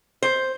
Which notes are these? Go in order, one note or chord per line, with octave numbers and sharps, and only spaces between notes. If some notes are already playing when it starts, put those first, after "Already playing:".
C5